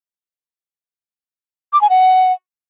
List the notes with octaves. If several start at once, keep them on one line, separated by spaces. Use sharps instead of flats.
D6
G#5
F#5